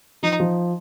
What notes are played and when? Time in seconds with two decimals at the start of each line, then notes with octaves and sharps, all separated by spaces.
0.23 F3 D#4
0.40 F3